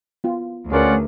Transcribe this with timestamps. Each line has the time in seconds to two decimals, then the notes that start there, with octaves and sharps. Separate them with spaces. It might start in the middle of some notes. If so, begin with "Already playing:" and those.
0.24 B3 F4
0.72 D2 C#4 F4 G#4 A#4 B4 D5 F#5